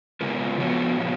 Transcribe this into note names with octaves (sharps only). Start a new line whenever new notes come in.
C#3 G#3 B3 F4 A#4
F3 B3 F#4 C#5
A#2 F3 B3